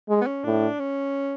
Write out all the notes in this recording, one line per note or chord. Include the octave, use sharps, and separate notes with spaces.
G#3
B3
C#4
A2 D4
C#4